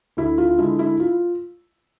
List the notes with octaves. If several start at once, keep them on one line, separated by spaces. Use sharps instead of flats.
D2 E4
F4
D3 G#3 E4
E4
F4